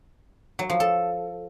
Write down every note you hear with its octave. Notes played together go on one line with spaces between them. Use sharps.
F#3
F3
A4